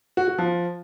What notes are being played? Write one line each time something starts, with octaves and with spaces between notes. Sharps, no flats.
F#4
F#4
F3